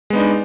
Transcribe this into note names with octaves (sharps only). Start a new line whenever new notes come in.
G#3 B3 D4 D#4